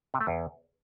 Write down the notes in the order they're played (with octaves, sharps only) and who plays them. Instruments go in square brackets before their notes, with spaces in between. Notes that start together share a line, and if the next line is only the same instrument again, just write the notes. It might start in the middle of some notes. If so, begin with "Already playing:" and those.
[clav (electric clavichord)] C3
A3
E2